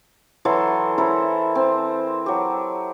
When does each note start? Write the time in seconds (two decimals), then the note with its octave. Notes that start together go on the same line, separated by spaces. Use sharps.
0.45 E3 F#3 A4 C6
0.98 E4 A4 A#4 C5
1.55 C4
2.26 F#3 G4